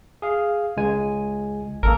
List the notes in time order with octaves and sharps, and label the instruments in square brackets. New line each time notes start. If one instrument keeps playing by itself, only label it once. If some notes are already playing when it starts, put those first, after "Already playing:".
[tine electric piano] G#4 F5
C#2 G#3 G#5
[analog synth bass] A1 [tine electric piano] A#3 A4 A#4